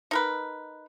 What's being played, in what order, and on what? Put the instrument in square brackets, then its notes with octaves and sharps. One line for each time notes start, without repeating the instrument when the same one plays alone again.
[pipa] D#4 A#4 B4